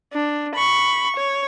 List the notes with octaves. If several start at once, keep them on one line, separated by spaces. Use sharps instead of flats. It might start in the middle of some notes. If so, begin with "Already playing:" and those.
D4
B5 C#6
C#5